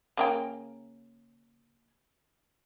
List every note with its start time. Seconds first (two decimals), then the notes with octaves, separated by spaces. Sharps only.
0.17 C#3 A#3 G5